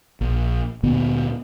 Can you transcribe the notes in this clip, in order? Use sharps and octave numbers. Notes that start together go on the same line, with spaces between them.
A#1
D2 A#2 D3 B3